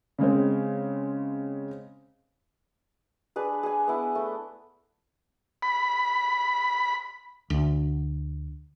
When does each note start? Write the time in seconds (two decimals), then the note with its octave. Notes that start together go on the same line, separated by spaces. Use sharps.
0.19 C#3 G#3 C4
3.36 D4 G#4 B4
3.63 G#4 G#5
3.87 B3 E4
4.15 A3
5.62 B5
7.50 D2